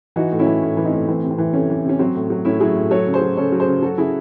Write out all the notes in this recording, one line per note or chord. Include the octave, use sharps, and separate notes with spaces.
E3 D#4 F#4
A2
C#4 E4
E3
A2
E3
C4 D#4
A2
E3 C4
C3
C4
E3
C3 A3 C#4
E3
C3 C#4
F#3 C4
A2
F#3
A2 C#4 E4
F#3 E4 G#4
A2
F#3 A4 C#5
C#3
G#4 C5
F#3
C#3 A4 C#5
F#3
G#4 C5
C#3
F#3 F#4 A4
C#3 E4 G#4